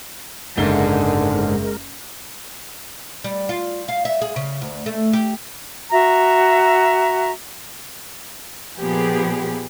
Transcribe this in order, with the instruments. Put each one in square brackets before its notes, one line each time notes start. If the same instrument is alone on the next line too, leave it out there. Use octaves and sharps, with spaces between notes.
[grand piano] F#1 E5 G7 [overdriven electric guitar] G#2 [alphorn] D3 [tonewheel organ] G#3 A#4
[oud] G3
F4
F5
E5
G#4
C#3
D2
A3
G4
[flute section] F#4 E5 A#5
[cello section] A#2 F3 B3 G4 G#4